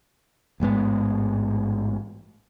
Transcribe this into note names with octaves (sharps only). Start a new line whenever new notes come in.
A1 G#2 G#3 B3